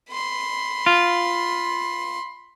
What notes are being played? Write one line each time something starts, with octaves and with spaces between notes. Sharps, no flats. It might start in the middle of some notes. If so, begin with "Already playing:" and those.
B5 C6
F4